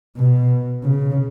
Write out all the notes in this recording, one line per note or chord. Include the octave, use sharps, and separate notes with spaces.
B2
C#3